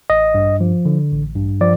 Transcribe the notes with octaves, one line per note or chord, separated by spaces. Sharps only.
A1 D#5
G2
F3
D3
A1
G2
F3 D5